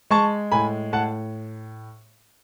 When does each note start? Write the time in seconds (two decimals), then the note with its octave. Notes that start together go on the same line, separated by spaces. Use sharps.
0.11 G#3 A5 C#6
0.52 A2 G#5 B5
0.93 A2 F#5 A5